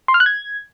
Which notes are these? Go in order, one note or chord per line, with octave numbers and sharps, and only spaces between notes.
C6
F6
F#6
G#6